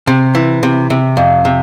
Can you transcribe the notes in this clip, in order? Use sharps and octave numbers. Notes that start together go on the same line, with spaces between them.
C3
E3
C3
C3
F2
C3